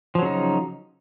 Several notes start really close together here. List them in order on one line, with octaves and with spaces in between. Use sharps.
F3 F#3 C#3 D#4